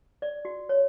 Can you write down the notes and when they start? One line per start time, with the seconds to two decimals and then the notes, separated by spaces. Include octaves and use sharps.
0.22 D5
0.45 F#4
0.69 C#5